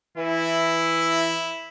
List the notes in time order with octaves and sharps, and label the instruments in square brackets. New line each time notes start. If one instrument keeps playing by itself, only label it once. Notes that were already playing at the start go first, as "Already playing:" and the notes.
[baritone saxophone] E3 [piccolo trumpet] E4